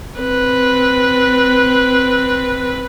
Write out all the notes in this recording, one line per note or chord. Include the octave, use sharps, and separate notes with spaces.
C4 B4